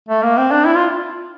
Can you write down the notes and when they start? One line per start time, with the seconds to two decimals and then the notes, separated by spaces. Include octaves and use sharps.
0.09 A3
0.22 A#3
0.37 C4
0.51 D4
0.66 E4
0.76 F4